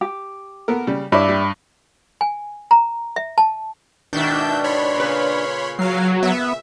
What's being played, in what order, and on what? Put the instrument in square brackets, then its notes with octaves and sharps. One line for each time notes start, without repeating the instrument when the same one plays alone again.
[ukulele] G4
[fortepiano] B3 A4 A#4
C#3 G3
[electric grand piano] G2 B5 [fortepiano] E4 [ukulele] D5 E5
[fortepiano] G3
[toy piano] G#5
A#5
E5
A5
[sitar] G#2 B2 D#3 [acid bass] D4 [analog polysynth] E5 G6
[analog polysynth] C#5 B5 C6
[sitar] A#2 C#3 B4
[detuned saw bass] F#3 [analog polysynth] F5 C7
[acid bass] B3 [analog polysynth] E5